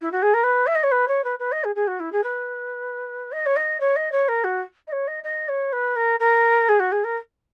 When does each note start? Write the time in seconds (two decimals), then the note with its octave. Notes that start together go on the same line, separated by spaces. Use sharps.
0.01 E4
0.12 F#4
0.22 G#4
0.34 A#4
0.43 B4
0.66 E5
0.75 D#5
0.83 C#5
0.91 B4
1.08 C#5
1.24 B4
1.39 B4
1.52 D#5
1.64 G#4
1.75 G#4
1.87 F#4
2.00 E4
2.12 G#4
2.23 B4
3.32 D#5
3.46 C#5
3.56 D#5
3.80 C#5
3.96 D#5
4.12 C#5
4.28 A#4
4.44 F#4
4.87 D#5
4.92 C#5
5.07 D#5
5.23 D#5
5.48 C#5
5.72 B4
5.96 A#4
6.20 A#4
6.68 G#4
6.79 F#4
6.92 G#4
7.04 A#4